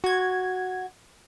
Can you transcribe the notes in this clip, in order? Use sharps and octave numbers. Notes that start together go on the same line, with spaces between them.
F#4 G#6